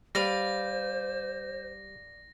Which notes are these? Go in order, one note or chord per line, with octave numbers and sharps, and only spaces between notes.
G3 B4 C5 D5 F5 A#6